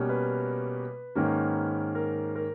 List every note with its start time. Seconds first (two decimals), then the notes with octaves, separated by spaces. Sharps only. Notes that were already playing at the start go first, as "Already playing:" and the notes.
Already playing: B2 G3 A#3 C#4
0.09 B4
1.15 G#2 D#3 A#3 C#4
1.95 A#4
2.35 A#4